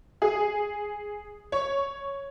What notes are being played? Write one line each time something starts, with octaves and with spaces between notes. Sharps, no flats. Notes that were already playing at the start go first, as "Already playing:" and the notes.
G#4
C#5